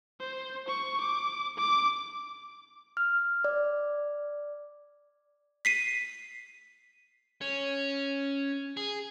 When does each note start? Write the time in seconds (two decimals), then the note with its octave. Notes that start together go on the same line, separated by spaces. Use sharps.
0.20 C5
0.68 C#6
1.00 D6
1.57 D6
2.97 F6
3.44 D5
5.65 B6 C7 D#7
7.41 C#4
8.77 G#4